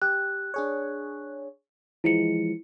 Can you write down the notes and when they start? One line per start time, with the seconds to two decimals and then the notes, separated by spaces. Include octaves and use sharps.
0.02 G4 F#6
0.54 D4 G#4 C#5
2.04 E3 F3 G#3 E4 C#7